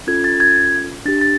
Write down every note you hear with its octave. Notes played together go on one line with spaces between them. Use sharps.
C#4 F4 A4 G#6
A6
G#6
D4 G4 A6
A6